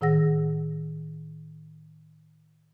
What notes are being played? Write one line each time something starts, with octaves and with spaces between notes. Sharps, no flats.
A2 D#3 G#4 F#5 E6 A#6